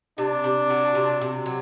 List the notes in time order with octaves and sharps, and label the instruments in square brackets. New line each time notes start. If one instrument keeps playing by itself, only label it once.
[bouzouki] C3 [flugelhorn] D4
[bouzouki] C3
F#3
C3
C3
F#3